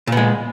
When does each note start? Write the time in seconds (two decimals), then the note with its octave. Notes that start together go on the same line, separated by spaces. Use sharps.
0.07 A#2
0.12 B3
0.17 G#3